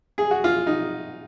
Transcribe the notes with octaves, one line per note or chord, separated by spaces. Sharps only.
G#4
F#4
F4
D#4